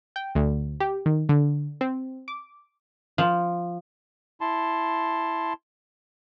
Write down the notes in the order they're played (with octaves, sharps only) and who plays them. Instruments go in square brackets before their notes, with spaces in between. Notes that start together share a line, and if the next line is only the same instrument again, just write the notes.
[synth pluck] G5
D2
G4
D#3
D3
C4
D6
[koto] F3
[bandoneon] E4 A5 C6